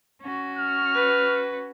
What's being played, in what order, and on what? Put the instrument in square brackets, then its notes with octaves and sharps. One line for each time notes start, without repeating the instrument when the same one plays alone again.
[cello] C#4 F#4
[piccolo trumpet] F6
[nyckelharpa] B4